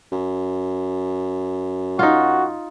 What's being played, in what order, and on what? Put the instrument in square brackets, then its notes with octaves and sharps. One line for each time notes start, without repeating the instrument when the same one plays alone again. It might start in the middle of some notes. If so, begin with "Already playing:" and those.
[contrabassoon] F#2
[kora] D#4 F4 [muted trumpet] F#4